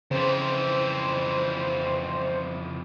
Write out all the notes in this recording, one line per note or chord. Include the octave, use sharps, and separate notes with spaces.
F2 C#3 E3 C5